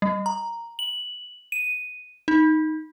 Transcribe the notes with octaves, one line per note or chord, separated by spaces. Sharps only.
G3
A#5
F#7
D#7
D#4